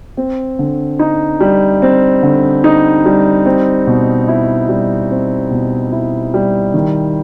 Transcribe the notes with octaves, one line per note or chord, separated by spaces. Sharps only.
C4
D3
D#4
G3
C4
D3
D#4
G3
C4
B2
E4
G3
C4
B2
E4
G3
D#3